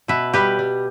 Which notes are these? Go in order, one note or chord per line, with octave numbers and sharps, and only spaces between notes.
B2 B4 E5
G3 G4 B4
G3